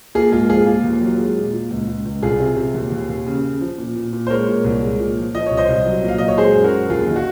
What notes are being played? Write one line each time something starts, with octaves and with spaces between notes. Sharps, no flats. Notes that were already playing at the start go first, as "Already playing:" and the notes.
A#3 F4 G#4
G#2 F4 G#4
F3 F4 G#4
A#3 F4
D#2
F#3
G#3
A#2
A#2
C#2
C#2
C#2
C2 F4 G#4
C3
C3
D#2
D#2
D#2
C#3
C#3
F3
A#2
A#2
A#2
C5
G#3 A#4 C#5
A#2
C2
G#3
A#2
F3
F3 D#5
C2 C#5
C5 D#5
C2
F#3
A#2
F5
F#3 D#5
C#5
G#3 G#4 C5
F#2
F#4 A#4
F#2
D#2 F4 G#4
D#3
F#4